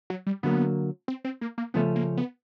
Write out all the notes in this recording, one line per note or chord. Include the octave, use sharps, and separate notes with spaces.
F#3
G3
D3 F#3 A#3 B3
C4
C4
A#3
A#3
C#3 F3 A3 B3 C#4
A#3
B3